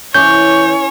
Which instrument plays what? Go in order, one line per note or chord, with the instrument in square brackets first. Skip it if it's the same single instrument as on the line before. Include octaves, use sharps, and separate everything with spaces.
[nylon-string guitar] E3 [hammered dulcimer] C#4 C#6 D6 [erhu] C#5 [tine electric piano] G6